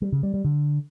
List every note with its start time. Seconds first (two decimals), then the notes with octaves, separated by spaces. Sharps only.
0.02 G3
0.12 C#3
0.23 G3
0.34 G3
0.44 D3